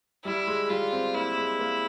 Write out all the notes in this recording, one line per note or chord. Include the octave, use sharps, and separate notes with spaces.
G3 E4
G#3
G3 F4
C4
A#3 E4
G#3
A#3